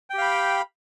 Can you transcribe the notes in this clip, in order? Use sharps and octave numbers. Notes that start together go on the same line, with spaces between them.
G4 F5 G5 B5